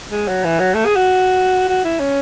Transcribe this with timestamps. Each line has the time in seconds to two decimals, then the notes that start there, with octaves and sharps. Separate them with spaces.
0.12 G#3
0.28 F#3
0.44 E3
0.60 F#3
0.74 A3
0.85 G#4
0.96 F#4
1.68 F#4
1.84 E4
2.00 C#4